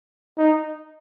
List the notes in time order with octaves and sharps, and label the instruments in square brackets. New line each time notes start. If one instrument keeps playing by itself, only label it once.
[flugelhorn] D#4